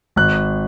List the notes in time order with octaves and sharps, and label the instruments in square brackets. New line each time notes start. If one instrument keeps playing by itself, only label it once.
[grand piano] G#1 F#6